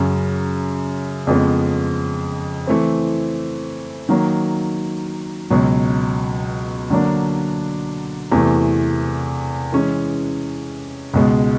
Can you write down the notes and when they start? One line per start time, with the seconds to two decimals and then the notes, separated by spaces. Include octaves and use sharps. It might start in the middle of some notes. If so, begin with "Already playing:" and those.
Already playing: F#2 C#3 F#3
1.27 F2 C#3 F3 G#3 B3
2.67 E3 A3 C4
4.09 D#3 F#3 A#3
5.50 C#2 B2 F#3
6.90 D3 F#3 A#3 D4
8.31 E2 C3 E3 A3
9.73 E3 G#3 C#4
11.14 C#2 B2 G#3